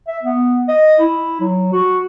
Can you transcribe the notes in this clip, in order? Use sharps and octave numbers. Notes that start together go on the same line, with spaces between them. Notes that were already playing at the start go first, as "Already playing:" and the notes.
E5
B3
D#5
E4
F#3
F#4